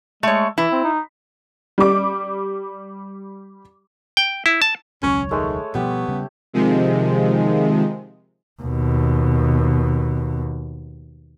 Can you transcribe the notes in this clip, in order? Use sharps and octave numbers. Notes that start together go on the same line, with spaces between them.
G#3 A3 C#5
E3 E4
C4
D#4
G3 D6
G5
E4
A5
E1 C#2 F#3 C#4 C#5
D#3 G#3 A3
B2 F3 G3 B3 G4
C#3 G3 C#4
C3 D#3 F3 G#3
D#2 B2